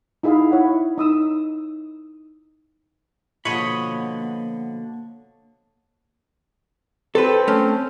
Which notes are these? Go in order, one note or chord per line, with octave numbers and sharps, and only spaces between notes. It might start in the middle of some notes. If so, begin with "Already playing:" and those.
D#4 E4 G#4 E5 F5
E4 C#5 E5 F#5
D#4 D#6 E6
B2 D3 F3 A#3 F4 C#5 D#5 B5
C4 A4 B4
A3 C#4